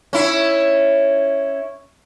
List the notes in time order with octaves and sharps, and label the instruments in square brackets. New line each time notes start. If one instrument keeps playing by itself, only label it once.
[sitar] C#4 E4